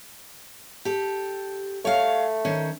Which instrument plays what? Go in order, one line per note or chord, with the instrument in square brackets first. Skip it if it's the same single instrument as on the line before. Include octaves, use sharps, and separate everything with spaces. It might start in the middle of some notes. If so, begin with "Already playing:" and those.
[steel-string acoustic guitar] G4 A4
[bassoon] A3 [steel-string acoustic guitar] C#5 F5
[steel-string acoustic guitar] D#3 C#4 C5